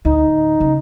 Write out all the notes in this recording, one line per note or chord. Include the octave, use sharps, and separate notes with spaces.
D2 A2 D#4
C#3 C#4